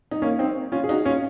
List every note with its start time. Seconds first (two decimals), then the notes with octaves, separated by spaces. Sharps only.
0.11 D#4
0.22 A#3 C#4
0.39 C4 D#4
0.72 C#4 F4
0.84 G#4
0.89 D#4 F#4
1.05 C#4 F4